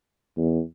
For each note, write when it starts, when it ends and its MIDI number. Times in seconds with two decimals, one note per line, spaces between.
0.37 0.60 40